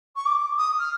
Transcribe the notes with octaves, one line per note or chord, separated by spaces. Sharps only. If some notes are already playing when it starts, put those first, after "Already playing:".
C#6
D6
D#6
F6